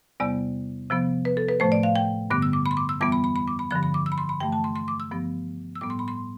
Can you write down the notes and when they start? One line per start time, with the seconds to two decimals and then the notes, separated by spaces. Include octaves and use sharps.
0.20 E2 C3 G3 B3 D5
0.90 C3 F3 B3
1.25 B4
1.37 A4
1.49 B4
1.60 A2 F3 A3 C5
1.72 D5
1.83 F5
1.96 G5
2.30 G2 D3 G3 B3 D6
2.42 E6
2.53 D6
2.66 B5
2.71 C6
2.77 D6
2.89 E6
3.01 F2 E3 G3 B3 D6
3.12 B5
3.24 B5
3.36 B5
3.48 D6
3.59 B5
3.71 G2 D3 F3 B5
3.83 B5
3.94 D6
4.06 E6
4.12 B5
4.18 C6
4.29 B5
4.40 G2 E3 A3 G5
4.52 A5
4.64 C6
4.76 C6
4.88 D6
5.00 E6
5.11 G2 F3 B3
5.76 E6
5.81 A2 G3 B3 D6
5.90 C6
5.99 B5
6.08 C6